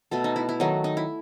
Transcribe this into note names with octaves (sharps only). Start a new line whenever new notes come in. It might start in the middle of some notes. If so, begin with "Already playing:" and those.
B2 A3 A4
D#4
E4
E4
D#3 F#3 A3 D#4
D#4
E4